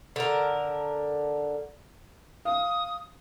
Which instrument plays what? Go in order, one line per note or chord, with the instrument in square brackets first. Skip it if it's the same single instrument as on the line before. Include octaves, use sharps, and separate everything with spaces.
[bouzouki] D3 A#4
[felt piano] F5 [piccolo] D#6